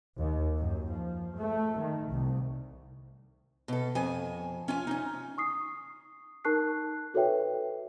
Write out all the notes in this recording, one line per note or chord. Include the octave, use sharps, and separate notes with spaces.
D#2
F#2
F3
A3
D#3
C2
B2 A4
F2 G#5
C#4 F4 G#5
C#4 D#4
C#6 D#6 C7
D#4 A#4 A5 C#6 F#6 C7
F#4 A4 B4 C#5 E5 G5